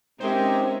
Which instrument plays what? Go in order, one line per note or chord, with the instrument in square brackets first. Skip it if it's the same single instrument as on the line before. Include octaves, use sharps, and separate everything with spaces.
[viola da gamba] G#3 C#4 [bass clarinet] C4 [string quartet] D#4 A#4 E5 [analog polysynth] G4 C5